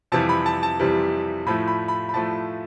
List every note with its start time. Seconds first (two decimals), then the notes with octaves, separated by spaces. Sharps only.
0.12 F2 C3 E3 G3 A5
0.29 B5
0.46 A5
0.63 A5
0.79 F2 C3 E3 G3
1.46 A2 F3 A3 B5
1.68 B5
1.88 B5
2.09 B5
2.14 A2 F3 A3 A5